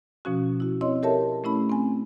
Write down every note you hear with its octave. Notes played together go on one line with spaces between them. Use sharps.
B2 F3 C#4 F#4
E4 F#4
C4 E4 C#5 D#5 C6
G4 A4 A#4 C#5 E5 A5
A3 C#4 E4 B5
C4 G#5